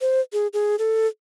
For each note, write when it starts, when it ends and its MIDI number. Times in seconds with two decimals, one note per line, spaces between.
0.01 0.21 72
0.33 0.47 68
0.53 0.76 68
0.79 1.07 69